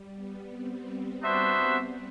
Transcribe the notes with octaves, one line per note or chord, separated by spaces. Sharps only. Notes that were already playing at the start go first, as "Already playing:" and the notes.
Already playing: G3
B3
C4
B3 D4 F#4 C5 E5